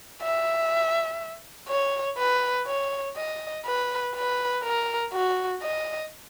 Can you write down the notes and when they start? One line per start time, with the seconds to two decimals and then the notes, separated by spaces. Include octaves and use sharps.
0.22 E5
1.68 C#5
2.18 B4
2.67 C#5
3.17 D#5
3.65 B4
4.15 B4
4.63 A#4
5.13 F#4
5.62 D#5